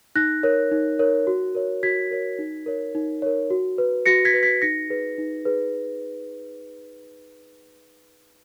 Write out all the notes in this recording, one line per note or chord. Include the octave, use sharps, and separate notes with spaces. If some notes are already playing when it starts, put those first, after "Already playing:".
D#4 F#6 A#6
A#4 C#5
D#4
A#4 C#5
F#4
A#4 C#5
F#4 G#6 B6
A#4 C#5
D#4
A#4 C#5
D#4
A#4 C#5
F#4
B4
F#4 A#6 C#7
G#6 B6
B4
G#6 B6
D#4 A#6 C#7
G#4 B4
D#4
G#4 B4